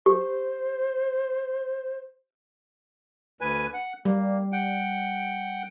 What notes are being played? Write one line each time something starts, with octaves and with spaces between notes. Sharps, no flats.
G4 C5
D2 B4 G#5
F#5
G3 A#3
F#5 G5